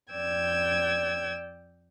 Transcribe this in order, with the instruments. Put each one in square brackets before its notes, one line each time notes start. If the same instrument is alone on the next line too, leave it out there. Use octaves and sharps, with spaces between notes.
[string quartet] F2 D5 G5 E6 G#6